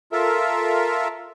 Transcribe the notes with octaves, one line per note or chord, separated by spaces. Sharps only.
F4 A4 A#4 E5